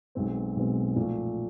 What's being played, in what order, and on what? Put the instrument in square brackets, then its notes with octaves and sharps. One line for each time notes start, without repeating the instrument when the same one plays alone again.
[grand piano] B1 B2 G#3 C4
B1 B2 G#3 C4
A#2 F3 A3